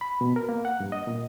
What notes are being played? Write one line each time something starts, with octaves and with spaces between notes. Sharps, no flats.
B5
B2
A#4
A#3
F#5
G2
D#5
A#2